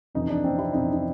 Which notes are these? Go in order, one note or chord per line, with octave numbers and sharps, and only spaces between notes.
F2 C3 E3 D#4
D4
C4
E4
F2 C3 E3 D#4
D#4